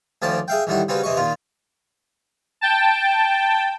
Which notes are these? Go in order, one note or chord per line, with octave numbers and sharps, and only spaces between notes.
D2 D#3 F3 C#4 D5 A5
G#4 E5 F5 G5
A1 D#3 G3 E4 F#4
C#3 G3 C4 C#4 F#4 B4
C3 E3 D#5 C#6
A#2 D#3 F4
G5 A5